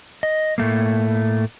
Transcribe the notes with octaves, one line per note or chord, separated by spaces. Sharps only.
D#5
A2 A3 A#3